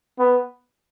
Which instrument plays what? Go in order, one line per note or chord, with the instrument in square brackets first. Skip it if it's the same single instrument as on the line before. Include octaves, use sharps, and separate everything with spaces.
[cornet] B3